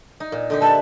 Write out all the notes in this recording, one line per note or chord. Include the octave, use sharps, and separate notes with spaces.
D#4
A#2
D3 D#4 G4
B4 E5 A5